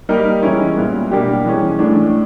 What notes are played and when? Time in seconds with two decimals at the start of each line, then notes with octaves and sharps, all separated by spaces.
0.09 G3 A#3 D#4 G4 A#4
0.43 E3 G#3 C#4 E4
0.77 A#2 G3 B3
1.11 B2 G3 A#3 D4 G4
1.46 E3 G#3 C#4
1.79 A2 E3 A3 D4